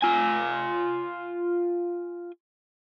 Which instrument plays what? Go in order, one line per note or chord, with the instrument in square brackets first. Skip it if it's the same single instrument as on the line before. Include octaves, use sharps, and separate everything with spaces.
[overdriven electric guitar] F4 G#5